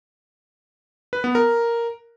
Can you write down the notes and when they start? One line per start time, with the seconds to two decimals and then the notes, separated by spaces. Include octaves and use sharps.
1.13 B4
1.24 B3
1.35 A#4